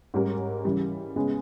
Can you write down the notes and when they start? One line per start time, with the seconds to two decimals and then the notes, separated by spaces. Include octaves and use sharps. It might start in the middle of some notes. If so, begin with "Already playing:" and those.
0.14 G#2 G3 C#4 G4 A#4
0.65 C#3 E3 G3
1.16 C#3 G#3 B3